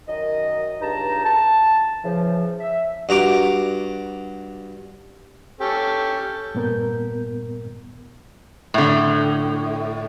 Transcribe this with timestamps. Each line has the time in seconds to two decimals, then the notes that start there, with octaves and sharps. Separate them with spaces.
0.08 F#2 D#3 D#5
0.81 C#2 G2 D#4 A5 A#5
1.25 A5
2.04 C#3 E3 F3
2.60 E5
3.09 G2 F#4 A#5 D6
5.61 C#4 G4 A4
6.55 G2 A#2 B3 A#4 G6
8.74 A2 D3